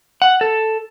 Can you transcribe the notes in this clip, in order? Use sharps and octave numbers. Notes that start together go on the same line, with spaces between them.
F#5
A4